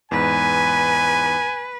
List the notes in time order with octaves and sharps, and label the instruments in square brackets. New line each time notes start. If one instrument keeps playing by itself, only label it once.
[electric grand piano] E2 G#2 [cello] B4 [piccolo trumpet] G#5